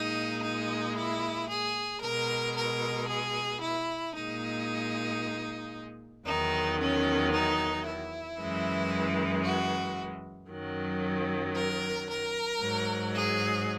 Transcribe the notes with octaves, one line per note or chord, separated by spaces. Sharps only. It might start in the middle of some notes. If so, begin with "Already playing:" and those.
Already playing: A#2 G#3 D#4
D#4
E4
G#4
B2 G#3 A#4
A#4
G#4
E4
A#2 G#3 D#4
E2 D#3 F#3 D#4
C#4
D#4
E4
F#2 E3 G#3
F#4
F#2 D#3 F#3
A#4
A#4
G#2 F#3
G#4